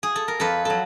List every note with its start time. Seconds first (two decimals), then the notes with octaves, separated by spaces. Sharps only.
0.03 G#4
0.16 A4
0.28 A#4
0.40 F2 A4 B4
0.65 F#3 A4